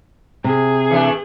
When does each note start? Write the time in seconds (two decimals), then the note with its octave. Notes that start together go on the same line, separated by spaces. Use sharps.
0.44 C3 G#4
0.90 E3 A3 D4